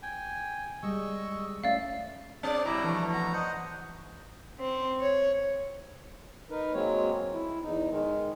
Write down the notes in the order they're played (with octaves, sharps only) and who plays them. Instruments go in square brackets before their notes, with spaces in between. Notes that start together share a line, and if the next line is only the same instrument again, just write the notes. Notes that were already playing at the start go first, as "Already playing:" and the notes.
[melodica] G5 G#5
[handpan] G3 G#3 [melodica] D#5 C#6 E6
[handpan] A3 C#4 E5 [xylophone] D5 F5
[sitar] C4 D5 [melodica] G#4
[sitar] B2 [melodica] G3 A#5 [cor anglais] E4
[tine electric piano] E3 F3 [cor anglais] A3
[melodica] B3 A#5
C5 D#5 F#5
[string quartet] C4
C#5
[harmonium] D#4 A#4 B4
F#3 G#3 A#3 C4 C#5
E4
E2 D#4
D#3 G#3